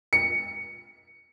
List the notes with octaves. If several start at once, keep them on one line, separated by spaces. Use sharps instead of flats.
C#7